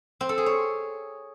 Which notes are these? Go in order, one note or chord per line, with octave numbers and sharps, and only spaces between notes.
C4
A4
G#4
C#5